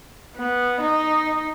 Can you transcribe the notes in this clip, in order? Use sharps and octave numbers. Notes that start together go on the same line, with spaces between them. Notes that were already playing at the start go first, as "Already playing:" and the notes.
B3
D#4